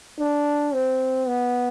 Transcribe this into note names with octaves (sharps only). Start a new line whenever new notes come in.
D4
C4
B3